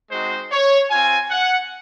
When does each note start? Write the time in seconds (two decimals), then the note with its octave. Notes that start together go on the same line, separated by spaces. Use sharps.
0.11 G#3 C4 D#4 F#4 C5
0.52 C#5
0.91 C4 F4 G#5
1.31 F#5